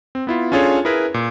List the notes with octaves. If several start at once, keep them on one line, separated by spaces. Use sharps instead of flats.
C4
B3 E4 F4
C#4 D4 F4 G#4 A4 C#5
E4 G#4 A#4 B4
A#2